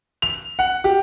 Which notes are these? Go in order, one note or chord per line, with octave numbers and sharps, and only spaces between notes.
F7
F#5
G4